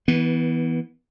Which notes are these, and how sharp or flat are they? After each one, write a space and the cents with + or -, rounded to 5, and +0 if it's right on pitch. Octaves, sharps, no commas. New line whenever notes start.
E3 -25 B3 +0